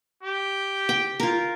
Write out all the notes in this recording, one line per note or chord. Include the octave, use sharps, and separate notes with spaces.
G4
G5
F4 A#4